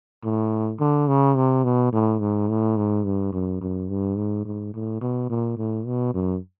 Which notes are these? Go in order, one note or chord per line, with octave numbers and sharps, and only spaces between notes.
A2
D3
C#3
C3
B2
A2
G#2
A2
G#2
G2
F#2
F#2
G2
G#2
G#2
A2
B2
A#2
A2
B2
F#2